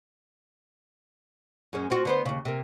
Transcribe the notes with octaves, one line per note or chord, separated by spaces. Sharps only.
F#2 G#3 C#4
C4 F4 F#4
D3 B3 C5
D#2 C#3
C3 A#3